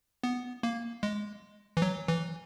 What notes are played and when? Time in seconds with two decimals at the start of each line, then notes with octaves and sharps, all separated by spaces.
0.24 B3
0.63 A#3
1.03 G#3
1.77 E3
1.82 F#3
2.08 E3